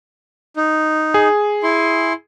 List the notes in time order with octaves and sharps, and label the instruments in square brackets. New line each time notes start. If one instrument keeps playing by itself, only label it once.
[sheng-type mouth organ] D#4
[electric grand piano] G#4
[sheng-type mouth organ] E4 C6